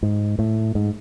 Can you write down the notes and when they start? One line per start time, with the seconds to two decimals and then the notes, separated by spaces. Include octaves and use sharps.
0.03 G#2
0.39 A2
0.75 G#2